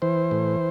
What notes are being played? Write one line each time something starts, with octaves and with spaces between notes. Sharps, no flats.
E3 C5
A2